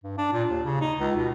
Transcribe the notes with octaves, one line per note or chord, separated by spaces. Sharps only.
G2
D4
A#2
D#2
C#3
D#4
C#2
B2